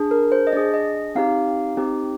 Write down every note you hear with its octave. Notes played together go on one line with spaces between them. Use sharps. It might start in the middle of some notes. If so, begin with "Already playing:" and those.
Already playing: D4 G#4
A#4
C5
D#5
D4 G#4 D5
D#5
C4 D#4 G4 F5
C4 D#4 G4